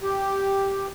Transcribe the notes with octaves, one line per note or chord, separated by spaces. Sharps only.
G4